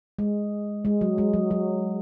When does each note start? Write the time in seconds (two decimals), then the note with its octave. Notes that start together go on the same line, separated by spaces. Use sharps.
0.19 G#3
0.85 G#3
1.01 F#3
1.18 G#3
1.34 F#3
1.51 F#3